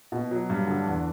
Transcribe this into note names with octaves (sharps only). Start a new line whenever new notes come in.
B2
F#3
G2
D3
E2